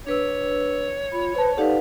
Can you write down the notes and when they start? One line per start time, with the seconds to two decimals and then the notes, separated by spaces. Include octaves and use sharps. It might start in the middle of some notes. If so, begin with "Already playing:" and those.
0.06 D4 B4 C#5 E6
1.12 F4 B5
1.35 B4 C5 A5
1.57 D#4 G4 A4 B4 D5 F5 F#5